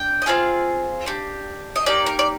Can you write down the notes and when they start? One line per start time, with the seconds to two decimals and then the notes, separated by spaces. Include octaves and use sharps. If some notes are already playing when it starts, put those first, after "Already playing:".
Already playing: D4 G5
0.22 D#5
0.26 C4 F4 G#4 F5
1.06 D4 G4
1.76 D#5
1.86 A#3 D#4 G4 D5
2.06 A#4
2.19 D5